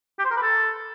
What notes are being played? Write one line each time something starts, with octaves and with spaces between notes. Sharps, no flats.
G4
C5
A#4
B4
A4